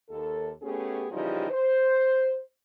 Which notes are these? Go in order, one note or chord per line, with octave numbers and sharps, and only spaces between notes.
D#2 A4
A3 B3 C#4 G4 G#4
C#3 E3 F3 G3 D#4 G4
C5